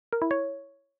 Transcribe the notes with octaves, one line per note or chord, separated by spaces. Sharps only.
A#4
E4
C#5